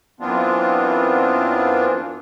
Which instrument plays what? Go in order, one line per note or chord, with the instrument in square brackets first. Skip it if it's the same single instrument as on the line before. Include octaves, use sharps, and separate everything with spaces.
[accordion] F#2 E3 B3 C4 D4 F4